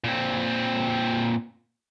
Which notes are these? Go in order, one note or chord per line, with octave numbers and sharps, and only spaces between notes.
A#2 C4